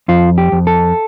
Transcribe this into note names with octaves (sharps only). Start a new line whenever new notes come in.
F2 F4
G4
F2
A4